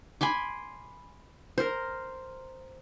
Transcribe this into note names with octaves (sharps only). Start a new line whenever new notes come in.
G#5 B5 C6 D6
A#4 C5